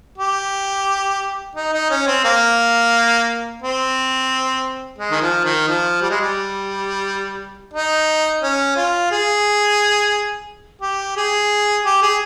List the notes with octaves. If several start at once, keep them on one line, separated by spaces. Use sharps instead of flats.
G4
D#4
D#4
C#4
C4
A#3
C4
G#3
D#3
F3
D#3
F3
G3
G#3
G3
D#4
C#4
F4
G#4
G4
G#4
G4
G#4